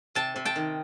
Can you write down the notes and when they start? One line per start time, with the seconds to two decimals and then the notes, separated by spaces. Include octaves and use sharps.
0.15 C3 G5 A5
0.36 C3
0.45 G5 A5
0.56 D#3